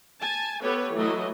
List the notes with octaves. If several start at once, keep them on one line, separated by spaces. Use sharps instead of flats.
G#5 A5
B3 G4 A4 B4 C#5
E3 F#3 A3 E4 D#5